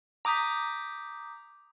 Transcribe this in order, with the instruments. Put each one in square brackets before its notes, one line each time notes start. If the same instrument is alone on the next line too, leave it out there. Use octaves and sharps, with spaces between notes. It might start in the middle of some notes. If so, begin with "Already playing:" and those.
[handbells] A#5 D6 D#6 G6 B6